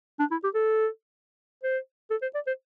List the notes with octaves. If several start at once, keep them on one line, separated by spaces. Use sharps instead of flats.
D4
E4
G4
A4
C5
A4
C5
D5
C5